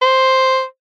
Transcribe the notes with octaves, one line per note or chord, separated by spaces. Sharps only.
C5